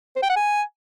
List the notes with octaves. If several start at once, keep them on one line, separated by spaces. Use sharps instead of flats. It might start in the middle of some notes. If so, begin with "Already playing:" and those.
C5
G5
F#5
G#5